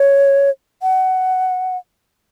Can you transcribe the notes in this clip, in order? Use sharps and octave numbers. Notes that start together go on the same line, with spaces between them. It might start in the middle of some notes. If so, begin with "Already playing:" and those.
Already playing: C#5
F#5